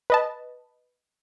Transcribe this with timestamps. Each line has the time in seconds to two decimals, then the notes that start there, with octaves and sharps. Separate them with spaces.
0.10 B4 D#5 A5